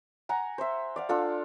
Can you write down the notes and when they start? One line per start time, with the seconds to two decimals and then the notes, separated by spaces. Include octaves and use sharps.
0.29 F#5 G#5 A#5
0.58 C5 E5
0.96 D5 F5 F#5
1.09 D4 F4 A4